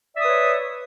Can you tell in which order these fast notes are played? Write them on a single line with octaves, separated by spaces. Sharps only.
D5 E5 D#6 B4 C#5